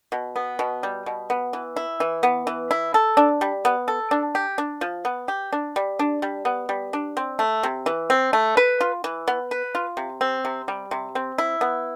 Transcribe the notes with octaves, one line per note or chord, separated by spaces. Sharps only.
B2
B3
B2
G3
B2
B3
E3
E4
E3
B3
E3
E4
A4
D4
G3
B3
A4
D4
G4
D4
F3
B3
G4
D4
G3
D4
G3
B3
G3
D4
C4
A3
C3
E3
C4
A3
B4
F4
E3
B3
B4
F4
C3
C4
C3
G3
C3
C4
E4
B3